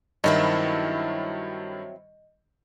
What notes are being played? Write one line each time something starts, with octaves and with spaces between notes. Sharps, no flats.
G2 D#3 F#3 C4 E4 D#5